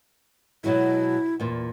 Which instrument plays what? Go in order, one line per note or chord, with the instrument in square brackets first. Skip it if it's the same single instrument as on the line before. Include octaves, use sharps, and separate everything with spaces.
[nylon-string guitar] B2 F#3 G#3 [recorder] E4
[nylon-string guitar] E2 A#2